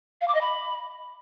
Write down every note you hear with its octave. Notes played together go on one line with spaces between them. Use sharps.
F5
D6
D#5
B5